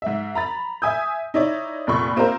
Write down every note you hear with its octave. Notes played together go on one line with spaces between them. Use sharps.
G#2 E5
A#5 B5 A6
E5 G#5 D#6 G6
D#4 E4 C#5 D5
F1 A#2 B5 C#6
A#3 C4 F4 A#4 C5